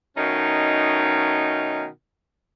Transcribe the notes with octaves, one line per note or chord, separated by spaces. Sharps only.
B2 D#3 A3 C#4 D#4